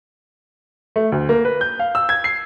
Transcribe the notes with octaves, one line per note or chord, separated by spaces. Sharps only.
A3
D2
A#3
B4
G6
F5
E6
G#6
C7